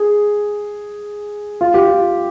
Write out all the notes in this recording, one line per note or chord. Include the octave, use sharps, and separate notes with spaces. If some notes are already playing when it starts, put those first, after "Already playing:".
Already playing: G#4
F4
G4
F4